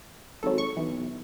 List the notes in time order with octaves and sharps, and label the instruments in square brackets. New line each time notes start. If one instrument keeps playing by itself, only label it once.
[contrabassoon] G#1 [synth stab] F#3 A4
[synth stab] C#6
[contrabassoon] B1 [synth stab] E3